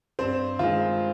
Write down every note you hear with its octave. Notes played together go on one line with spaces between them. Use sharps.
G2 C4 C5
D#3 G#3 F4